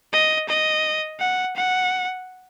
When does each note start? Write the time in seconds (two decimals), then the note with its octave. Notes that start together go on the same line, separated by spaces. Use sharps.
0.13 D#5
0.49 D#5
1.20 F#5
1.56 F#5